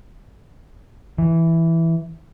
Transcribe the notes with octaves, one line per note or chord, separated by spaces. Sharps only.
E3